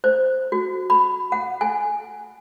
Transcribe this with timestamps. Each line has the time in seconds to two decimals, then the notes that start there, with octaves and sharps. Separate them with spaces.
0.04 C5
0.52 F#4
0.90 B5
1.32 F#5
1.61 G#5